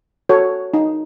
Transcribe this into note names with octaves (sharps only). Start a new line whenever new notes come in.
F#4 A4 C#5
D#4